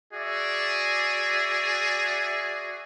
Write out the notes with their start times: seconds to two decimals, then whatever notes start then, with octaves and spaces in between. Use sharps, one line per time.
0.13 F#4 G#4 D5 E5